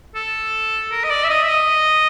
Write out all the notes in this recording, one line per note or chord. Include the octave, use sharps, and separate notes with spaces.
A4
A#4
D#5
D5
E5
D#5
E5
D#5